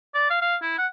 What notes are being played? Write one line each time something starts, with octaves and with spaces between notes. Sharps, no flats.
D5
F5
F5
E4
F#5